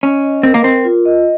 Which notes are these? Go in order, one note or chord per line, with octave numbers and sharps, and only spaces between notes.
C#4 D#5
D#5
C4 A#4
A#3
C4 A#4
F4
D#5